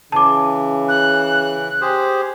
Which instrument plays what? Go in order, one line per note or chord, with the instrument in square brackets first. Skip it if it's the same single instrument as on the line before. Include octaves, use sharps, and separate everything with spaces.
[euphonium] C#3 [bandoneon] E3 [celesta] A5 D6
[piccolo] F#6
[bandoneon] G4 G#4 C5